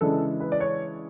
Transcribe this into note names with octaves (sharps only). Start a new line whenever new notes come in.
C#3 E3 G#3 D4 A4
B4
D5
C#5